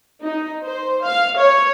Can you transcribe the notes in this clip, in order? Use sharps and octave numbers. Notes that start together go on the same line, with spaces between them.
D#4
C5
F5
C#5